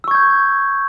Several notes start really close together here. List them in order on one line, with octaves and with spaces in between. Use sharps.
E6 C#6 G#6 G6